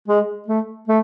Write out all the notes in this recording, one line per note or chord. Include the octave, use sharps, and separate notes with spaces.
G#3
A3
A3